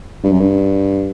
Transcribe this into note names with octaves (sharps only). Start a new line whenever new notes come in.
G2
F#2
G2